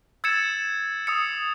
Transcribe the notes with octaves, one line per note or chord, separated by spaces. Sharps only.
E6 G#6 A6 C#7 E7
D#6 E6 C#7